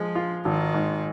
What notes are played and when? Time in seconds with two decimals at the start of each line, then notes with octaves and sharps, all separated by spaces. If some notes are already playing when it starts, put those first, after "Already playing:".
Already playing: F3 G#3
0.15 F4
0.45 G#1 D#3
0.74 G#2